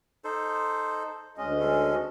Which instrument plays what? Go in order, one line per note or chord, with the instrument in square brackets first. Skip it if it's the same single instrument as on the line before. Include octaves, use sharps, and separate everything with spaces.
[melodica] D#4 A4 C5
[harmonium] D2 D#5 [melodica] G#3 C#4
[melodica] G#3 C#4 A4